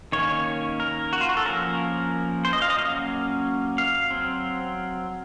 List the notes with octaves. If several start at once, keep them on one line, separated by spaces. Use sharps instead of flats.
D#3 A#3 C#4 C#5
A#4
F#4
F4
F#4
A4
F3 A#3 C#4 A#4
C5
D#5
F5
D#5
F#3 A#3 C#4 F5
F5
F#3 C4